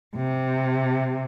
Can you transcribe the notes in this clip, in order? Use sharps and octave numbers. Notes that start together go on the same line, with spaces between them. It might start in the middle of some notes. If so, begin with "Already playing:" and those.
C3